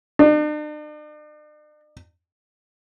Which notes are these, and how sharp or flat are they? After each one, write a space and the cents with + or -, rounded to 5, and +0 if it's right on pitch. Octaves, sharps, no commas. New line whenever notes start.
D4 +45